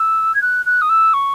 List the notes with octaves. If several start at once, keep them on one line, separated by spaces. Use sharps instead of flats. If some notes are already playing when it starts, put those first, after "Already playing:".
Already playing: E6
G#6
F#6
F#6
D#6
E6
C#6